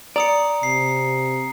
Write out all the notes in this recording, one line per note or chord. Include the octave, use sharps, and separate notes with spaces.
D5 A#5 D#6 C#7
C3 C7